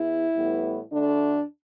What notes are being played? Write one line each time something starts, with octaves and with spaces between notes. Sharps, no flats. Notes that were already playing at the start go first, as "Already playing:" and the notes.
Already playing: E2 E4
A2 E3 G3 B3
D2 D3 A3 D4